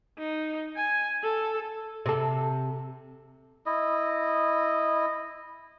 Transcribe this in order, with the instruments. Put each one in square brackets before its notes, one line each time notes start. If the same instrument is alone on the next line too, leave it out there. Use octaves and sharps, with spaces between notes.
[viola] D#4
G#5
A4
[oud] C3 A4
[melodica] E4 D#5